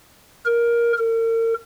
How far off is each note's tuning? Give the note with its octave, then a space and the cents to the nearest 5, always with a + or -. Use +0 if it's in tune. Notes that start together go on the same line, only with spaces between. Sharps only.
A#4 +10
A#4 -40